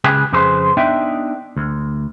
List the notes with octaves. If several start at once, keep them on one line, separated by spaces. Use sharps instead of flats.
C#2 C#3 G4 G#4 B4 G5
F2 C#3 G#4 B4 C5 C6
B3 D4 D#4 E5 G5
D2